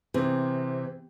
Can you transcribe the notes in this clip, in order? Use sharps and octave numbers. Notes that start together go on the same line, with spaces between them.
C3 E3 C4 G#4